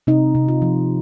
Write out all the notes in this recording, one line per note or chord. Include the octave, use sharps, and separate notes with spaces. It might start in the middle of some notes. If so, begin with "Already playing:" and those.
C3 D#4
C3
F4
F3